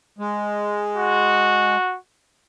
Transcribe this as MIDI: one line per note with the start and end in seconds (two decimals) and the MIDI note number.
0.19 1.77 56
0.96 1.96 66